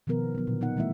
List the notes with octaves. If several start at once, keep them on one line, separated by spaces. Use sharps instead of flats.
B2 D#3 F3 B3 A#4
F#3 B3
A#2 D3
B3 D#4 F#5
E3 G3 A3 B3 E4 E5